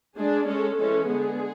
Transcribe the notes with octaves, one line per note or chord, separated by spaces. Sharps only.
G#3 D4 G#4
G#3 C#4 A4
E3 G#3 C#4 A4
D3 G#3 B3 G#4